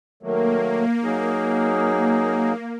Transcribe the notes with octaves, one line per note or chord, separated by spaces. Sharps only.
D#3 F#3 A3 A#3
F#3 D#4 G#4